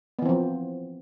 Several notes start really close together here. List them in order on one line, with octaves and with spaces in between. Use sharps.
B3 E3 C4 F3